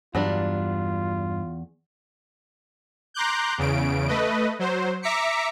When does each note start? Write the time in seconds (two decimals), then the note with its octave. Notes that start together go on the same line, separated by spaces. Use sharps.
0.15 E2 G2 F#3 G3 D4 F4
3.14 A#5 C6 D6 F#6 G6
3.58 E2 C#3 D7
4.08 A3 B4 D#5
4.59 F#3 C5
5.02 E5 A#5 D6 B6 C#7